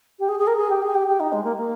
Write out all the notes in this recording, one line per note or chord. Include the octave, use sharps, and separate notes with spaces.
G4
G#4
G#4
A#4
G#4
G4
G#4
G4
G4
D#4
G#3
A#3
A#3